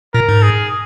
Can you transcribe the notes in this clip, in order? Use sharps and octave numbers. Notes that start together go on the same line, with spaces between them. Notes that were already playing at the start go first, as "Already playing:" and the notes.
A#2 A#4
G#2
G#4